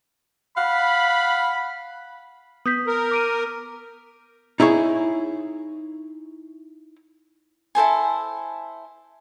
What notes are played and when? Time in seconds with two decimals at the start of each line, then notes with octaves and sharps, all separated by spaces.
0.58 F5 F#5 B5
2.66 B3 D#6 G6 B6
2.87 A#4
3.11 D6 D7 D#7
4.60 D#4 E4 G#4 C#5
7.75 E4 A4 C5 G#5